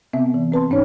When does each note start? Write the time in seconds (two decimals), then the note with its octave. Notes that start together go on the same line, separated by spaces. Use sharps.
0.13 C3 B3 C4 E5
0.34 E3
0.52 C4 B4 A5 C6
0.70 G#2 C#4 D#4 C#5